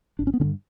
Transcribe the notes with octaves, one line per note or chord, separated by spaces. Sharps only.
G1 D4
C#4
B3
G2 D3 C#4